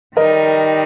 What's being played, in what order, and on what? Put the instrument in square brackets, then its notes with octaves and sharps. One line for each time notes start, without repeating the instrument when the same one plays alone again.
[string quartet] D#3 G3 D#4 [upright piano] A#4 D#5